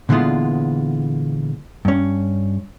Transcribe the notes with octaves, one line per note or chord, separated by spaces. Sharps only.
A#2 D3 E3 G#3 B3 F4
G2 C#4